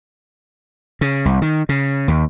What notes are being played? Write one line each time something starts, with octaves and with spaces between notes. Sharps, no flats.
C#3
C2
D#3
C#3
D#2